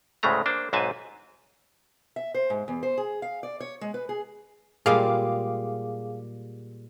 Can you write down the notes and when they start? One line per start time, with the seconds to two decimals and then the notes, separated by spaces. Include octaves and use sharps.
0.23 D2 A2 C#3 G#3 A3 A#5
0.46 A#3 D4 C5
0.73 B1 G#2 C4 B4 G#5 A5
2.16 E5
2.34 C5
2.50 G#2
2.68 E2
2.83 C5
2.98 G#4
3.22 F5
3.43 D5
3.60 C#5
3.81 G#3
3.94 B4
4.09 G#4
4.86 A#2 G3 G#3 G#4 F5 D6